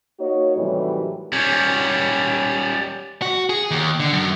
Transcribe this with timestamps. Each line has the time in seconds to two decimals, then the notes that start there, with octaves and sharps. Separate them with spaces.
0.20 A#3 D#4 F#4 C#5
0.57 A2 C3 D#3 E3 F#3 G3
1.33 G3 C#4
3.22 F#4
3.50 G#4
3.71 D#2
4.00 D3
4.13 F#2